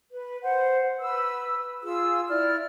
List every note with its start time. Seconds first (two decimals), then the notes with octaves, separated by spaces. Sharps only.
0.12 B4
0.43 C5 F#5
1.00 B4 E6
1.82 F4 G#4 E6
2.29 E4 D5 F6